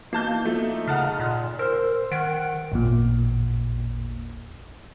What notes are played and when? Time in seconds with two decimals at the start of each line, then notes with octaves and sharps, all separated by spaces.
0.13 E3 A#3 D#4 A5 G6
0.45 F3 A3
0.87 C#3 F#5 A5 F6
1.20 A#2
1.59 A#4 C5 E6
2.12 D#3 F#5 D7
2.72 A1 E2 A#2